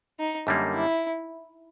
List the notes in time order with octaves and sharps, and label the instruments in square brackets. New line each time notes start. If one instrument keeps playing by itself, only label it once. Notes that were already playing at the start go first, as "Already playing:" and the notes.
[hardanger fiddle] D#4
[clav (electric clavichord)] F#2 D3 G3 A#3 D#4
[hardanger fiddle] E4